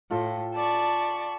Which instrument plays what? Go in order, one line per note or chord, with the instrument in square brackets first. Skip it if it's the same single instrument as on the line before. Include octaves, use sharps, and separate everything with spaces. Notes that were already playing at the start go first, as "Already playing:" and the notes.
[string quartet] A2 [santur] F4 A4 G5
[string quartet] D5 B5 C#6 [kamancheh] A5